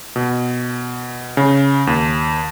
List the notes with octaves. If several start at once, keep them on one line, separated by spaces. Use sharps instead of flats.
B2
C#3
D#2